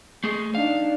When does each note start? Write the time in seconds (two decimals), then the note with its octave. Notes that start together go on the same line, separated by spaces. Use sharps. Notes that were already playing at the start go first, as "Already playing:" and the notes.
0.24 A3 G#4
0.55 D4 D#4 F5